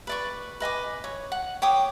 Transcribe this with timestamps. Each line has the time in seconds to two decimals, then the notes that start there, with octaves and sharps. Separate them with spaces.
0.07 B4 D5 C#6
0.60 B4 D#5 G#5 D6
1.04 C#5
1.32 F#5
1.62 C#5 G5 D6 D#6